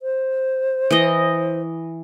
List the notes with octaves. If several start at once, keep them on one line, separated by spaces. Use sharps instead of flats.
C5
E3 D#5